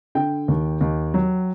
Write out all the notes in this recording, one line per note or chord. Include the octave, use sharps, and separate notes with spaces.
D3 G5
D#2
D#2
F#3